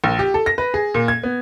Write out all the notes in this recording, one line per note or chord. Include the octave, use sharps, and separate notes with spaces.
A#1
G4
A4
A#6
B4
G#4
A#2
G#6
B3